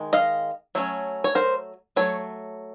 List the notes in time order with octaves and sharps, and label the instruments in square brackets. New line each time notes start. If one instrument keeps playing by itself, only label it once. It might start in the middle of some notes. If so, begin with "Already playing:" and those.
Already playing: [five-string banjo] D#3 G#3
D#5 F5
F#3 A3 C#4
C#5
A#4 C5
F#3 A3 C#5